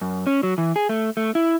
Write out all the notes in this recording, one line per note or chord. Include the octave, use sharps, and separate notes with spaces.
F#2
C#4
F#3
E3
G#4
A3
A3
E4